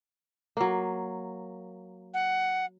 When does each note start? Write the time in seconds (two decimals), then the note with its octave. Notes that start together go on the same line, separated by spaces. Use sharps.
0.57 F#3 A#3
2.14 F#5